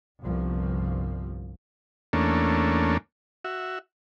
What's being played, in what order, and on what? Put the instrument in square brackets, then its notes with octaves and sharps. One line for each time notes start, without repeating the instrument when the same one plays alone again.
[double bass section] G1 C2 F3
[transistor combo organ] E2 A3 A#3 C#4 D4
F#4 E5